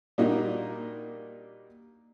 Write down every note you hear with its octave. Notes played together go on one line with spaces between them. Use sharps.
A#2 G3 A#3 D4 D#4 F#4